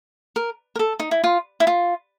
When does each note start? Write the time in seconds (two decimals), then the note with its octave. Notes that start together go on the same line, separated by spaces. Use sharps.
0.36 A#4
0.76 A#4
0.79 A4
1.00 D#4
1.11 E4
1.24 F4
1.60 E4
1.67 F4